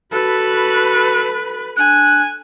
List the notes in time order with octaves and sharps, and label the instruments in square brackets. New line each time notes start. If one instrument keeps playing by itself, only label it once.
[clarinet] F#4 [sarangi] A4 [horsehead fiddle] B4 B5
[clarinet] D4 [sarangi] G#5 [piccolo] F#6